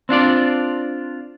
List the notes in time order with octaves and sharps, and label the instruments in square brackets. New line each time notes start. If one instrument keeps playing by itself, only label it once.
[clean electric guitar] C4 D4 F4 D5